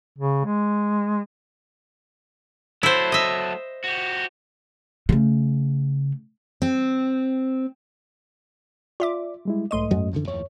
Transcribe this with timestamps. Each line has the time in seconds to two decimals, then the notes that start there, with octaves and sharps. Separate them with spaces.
0.18 C#3
0.45 G#3
2.83 F#3 A3 E4 C5
3.12 D#5 E5
3.84 F#4 G4
5.09 C#3 A3
6.62 C4
9.00 F4 D5 E5 D6
9.45 G3 G#3 E4
9.71 B1 G#2 A3 D#5 C6 D#7
9.91 F#2 F#3
10.13 C#3 E3 F3
10.28 D#2 A2 F3 C#5